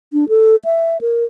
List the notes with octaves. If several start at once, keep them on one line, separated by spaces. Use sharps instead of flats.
D4
A4
E5
A#4